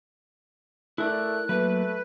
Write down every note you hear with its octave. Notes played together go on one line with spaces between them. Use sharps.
A3 E4 A#4 D5 F#6
F#3 A3 A#3 B4